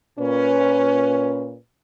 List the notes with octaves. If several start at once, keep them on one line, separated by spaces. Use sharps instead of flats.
A#2 C#4 B4